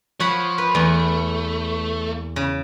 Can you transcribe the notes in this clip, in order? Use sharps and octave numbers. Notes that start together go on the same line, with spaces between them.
F3 C#5 F#5 B5
B4
E2 A3
C#3